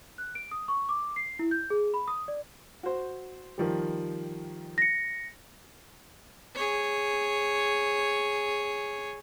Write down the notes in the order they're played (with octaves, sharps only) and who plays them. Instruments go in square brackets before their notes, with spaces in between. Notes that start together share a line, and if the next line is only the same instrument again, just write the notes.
[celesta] F#6
D7
D#6
C#6
D6
C7
E4
G6
G#4
B5
D#6
D5
[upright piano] F#4 C5
D#3 F3 G3
[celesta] A#6 C#7
[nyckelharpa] G#4 C#5